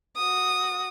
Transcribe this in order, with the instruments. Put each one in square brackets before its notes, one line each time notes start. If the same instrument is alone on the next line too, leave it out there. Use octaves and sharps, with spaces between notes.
[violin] F#4 D#6